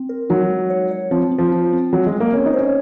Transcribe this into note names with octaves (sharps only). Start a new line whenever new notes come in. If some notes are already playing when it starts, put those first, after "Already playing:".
Already playing: C4
A#4
F#3 D#4
G#3
C#5
C#5
F3 C4
C4
F3
F4
C4
F#3 C4
G#3
C4
A#3
C4 C#4
D#4
C5
C#4